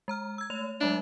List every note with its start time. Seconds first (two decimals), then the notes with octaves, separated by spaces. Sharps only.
0.08 G#3 A#5 F6
0.38 E6 G#6
0.50 A3 C#5 F7
0.81 F#3 G#3 D4 E5